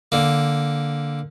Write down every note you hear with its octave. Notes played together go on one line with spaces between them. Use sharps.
D3 A#3